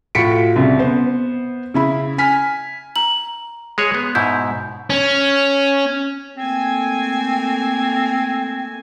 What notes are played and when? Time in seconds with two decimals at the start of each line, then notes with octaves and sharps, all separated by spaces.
0.15 A2 F4 F#4 B6 C#7 D7
0.56 C2 C#3
0.79 B3 C5
1.74 C#3 E4 B5
2.18 G#5 F6 B6
2.96 A#5 F#7
3.78 G#3 G#4 C#5
3.95 B3
4.15 G#2 B2 E4 G6
4.90 C#4
6.37 A3 A#3 C4 G#5